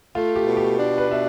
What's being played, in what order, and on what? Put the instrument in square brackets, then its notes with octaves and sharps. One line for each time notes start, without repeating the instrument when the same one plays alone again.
[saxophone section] A3 [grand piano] F4
[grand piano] G4
[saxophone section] B2
[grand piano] G4
[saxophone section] D4
[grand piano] B4
[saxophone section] B2 [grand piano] E5